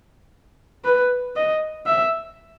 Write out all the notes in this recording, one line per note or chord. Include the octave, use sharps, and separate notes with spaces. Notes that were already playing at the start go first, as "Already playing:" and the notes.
B4
D#5
E5